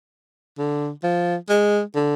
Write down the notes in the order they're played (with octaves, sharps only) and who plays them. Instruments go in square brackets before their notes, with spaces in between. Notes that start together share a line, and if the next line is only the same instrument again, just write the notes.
[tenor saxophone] D3
F3
G#3
D3